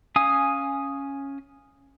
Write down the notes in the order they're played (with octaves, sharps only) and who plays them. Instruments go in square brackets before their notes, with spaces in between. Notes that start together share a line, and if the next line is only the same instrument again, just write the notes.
[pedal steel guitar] C#4 F5 G#5 D#6